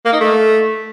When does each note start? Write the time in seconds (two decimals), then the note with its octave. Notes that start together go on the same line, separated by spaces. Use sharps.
0.06 A#3
0.13 D#4
0.20 A3